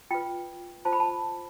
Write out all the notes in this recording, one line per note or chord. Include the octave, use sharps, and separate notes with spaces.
F4 B4 G5
F4 C5 A5
B5
A5